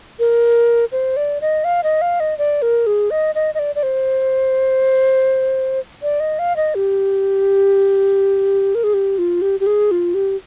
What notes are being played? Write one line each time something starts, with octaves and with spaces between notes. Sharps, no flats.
A#4
C5
D5
D#5
F5
D#5
F5
D#5
D5
A#4
G#4
D#5
D#5
D#5
D5
D5
C5
D5
D#5
F5
D#5
G4
A#4
G#4
G4
F4
G4
G4
G#4
F4
G4